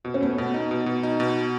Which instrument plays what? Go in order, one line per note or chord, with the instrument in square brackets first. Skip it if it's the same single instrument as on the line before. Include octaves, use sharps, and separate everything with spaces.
[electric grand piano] B2 [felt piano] B3
[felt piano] C#4
[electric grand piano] A3 [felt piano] B3
[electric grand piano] B2 [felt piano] B3
[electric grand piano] D#4
B2
B2
D#4
B2